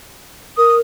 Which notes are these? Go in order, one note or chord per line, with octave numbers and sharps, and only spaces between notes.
A#4 D#6